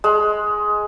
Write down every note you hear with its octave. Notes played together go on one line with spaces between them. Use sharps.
G#3